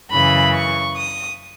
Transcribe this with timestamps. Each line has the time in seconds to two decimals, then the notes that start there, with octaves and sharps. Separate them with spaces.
0.11 F#2 C#3 E3 B5
0.54 C#6
0.97 D#6